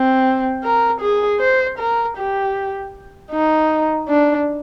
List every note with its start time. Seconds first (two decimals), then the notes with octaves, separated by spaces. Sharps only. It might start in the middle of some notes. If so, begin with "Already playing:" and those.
Already playing: C4
0.63 A#4
1.01 G#4
1.40 C5
1.79 A#4
2.17 G4
3.32 D#4
4.09 D4